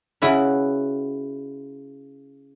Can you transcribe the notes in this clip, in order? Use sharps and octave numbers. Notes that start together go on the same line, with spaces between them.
C#3 E4 F#4 B4